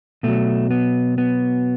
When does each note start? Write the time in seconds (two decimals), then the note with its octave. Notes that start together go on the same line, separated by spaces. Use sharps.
0.23 B2 F#3 A3
0.71 B3
1.18 B3